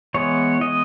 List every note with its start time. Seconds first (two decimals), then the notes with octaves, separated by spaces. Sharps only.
0.14 E3 G#3 B3 C#5
0.61 D#5